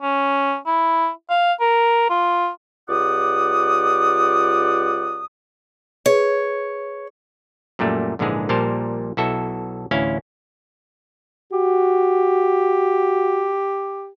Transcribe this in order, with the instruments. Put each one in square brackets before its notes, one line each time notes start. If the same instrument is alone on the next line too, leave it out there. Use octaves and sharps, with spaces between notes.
[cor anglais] C#4
E4
F5
A#4
F4
[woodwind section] C#2 F4 G4 D5 F#5 D#6
[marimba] G#4 B4 G#6 [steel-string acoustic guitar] C#5
[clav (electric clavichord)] F#2 A#2 G3 A3
A#1 G#2 D3 E3 G#3 G#4
A#1 A#2 G3 A#4 C5 A5
B1 E4 F#4 A4 E5
A1 D2 C#4 E4 F5
[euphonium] F#4 [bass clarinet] G4